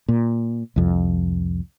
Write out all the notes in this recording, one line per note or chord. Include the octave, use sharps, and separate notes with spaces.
A#2
C2 F2